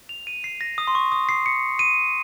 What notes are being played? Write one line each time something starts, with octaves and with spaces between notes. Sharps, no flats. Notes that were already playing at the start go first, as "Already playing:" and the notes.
F7
D#7
C7
A#6
D#6
C6
C#6
D#6
C7
C#7
D#7